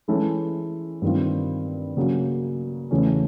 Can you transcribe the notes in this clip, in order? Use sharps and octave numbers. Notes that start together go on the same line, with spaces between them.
E3 G#3 C#4 E4 A4
G2 D#3 G3 C4 F4
C#3 F#3 A#3
E2 C#3 E3 A3 C#4